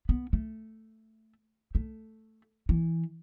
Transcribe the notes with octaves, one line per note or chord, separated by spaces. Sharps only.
B3
A3
A3
E3